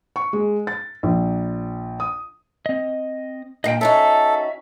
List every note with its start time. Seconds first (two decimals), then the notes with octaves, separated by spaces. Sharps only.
0.16 C#6
0.33 G#3
0.67 A6
1.03 A#1
2.00 D#6
2.66 C4 D#5
3.64 G2 A#2 D#5 F5 G5
3.81 C#4 D#4 F#4 A4 E5